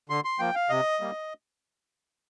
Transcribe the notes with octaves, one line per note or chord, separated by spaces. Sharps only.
D3 C6
C6
F3 A#3 G5
F5
C3 D#5
G3 A#3